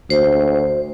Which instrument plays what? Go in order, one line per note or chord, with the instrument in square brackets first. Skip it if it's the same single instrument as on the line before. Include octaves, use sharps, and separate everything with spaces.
[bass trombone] D2 [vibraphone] C5